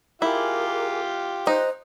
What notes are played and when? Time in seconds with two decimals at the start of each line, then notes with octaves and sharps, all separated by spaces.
0.22 E4 F4 G4 G#4 A#4 D6
1.47 D#4 C5 F#6